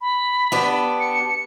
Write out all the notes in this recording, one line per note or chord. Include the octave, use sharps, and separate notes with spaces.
B5
B3 D4 G4
C#7